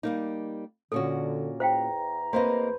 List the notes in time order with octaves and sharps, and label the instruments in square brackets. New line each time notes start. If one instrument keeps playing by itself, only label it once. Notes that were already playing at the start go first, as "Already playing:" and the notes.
[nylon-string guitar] G3 A#3 D#4
[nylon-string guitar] A#2 C#4 F#4 [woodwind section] D3 [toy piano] A4
[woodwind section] E2 E3 A#5 [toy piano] C5 F5 G5
[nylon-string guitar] A#3 C4 D#5 [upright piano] B4 C5 [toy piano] F5